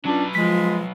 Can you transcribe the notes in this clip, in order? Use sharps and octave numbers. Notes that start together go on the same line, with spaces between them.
F#3 C#4 D4 F4 B4
F3 G#3 B6